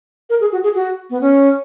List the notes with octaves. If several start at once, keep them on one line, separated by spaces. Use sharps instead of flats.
A#4
G#4
F#4
G#4
F#4
B3
C#4